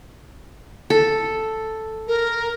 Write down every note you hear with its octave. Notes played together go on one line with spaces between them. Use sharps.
A4
A#4